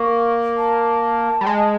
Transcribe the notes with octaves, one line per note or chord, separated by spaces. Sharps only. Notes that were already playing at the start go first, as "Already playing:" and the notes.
Already playing: A#3 C#6
A5
G3
G#3